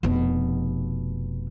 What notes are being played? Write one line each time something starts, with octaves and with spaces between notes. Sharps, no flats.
F1 B2